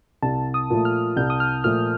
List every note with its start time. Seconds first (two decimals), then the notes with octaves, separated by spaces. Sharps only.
0.23 C2 A5
0.54 D#6
0.70 A#2 F3 A3
0.85 F6
1.17 C2 G6
1.30 D#6
1.40 F6
1.64 A#2 F3 A3 F6